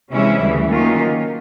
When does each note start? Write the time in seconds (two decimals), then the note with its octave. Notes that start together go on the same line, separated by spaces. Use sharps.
0.11 C3 E3 G#3 C#4 E4
0.41 D2 C#3 E3 G3
0.70 D#3 F#3 A#3 C#4 F4